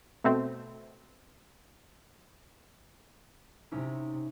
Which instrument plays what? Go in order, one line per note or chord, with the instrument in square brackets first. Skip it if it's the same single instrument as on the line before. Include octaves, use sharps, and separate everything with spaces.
[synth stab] B2 A3 C4
[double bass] C3 [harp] C#4 D#4 E4